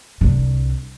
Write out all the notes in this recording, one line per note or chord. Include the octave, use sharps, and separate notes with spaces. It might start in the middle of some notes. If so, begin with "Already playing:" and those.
C2 D3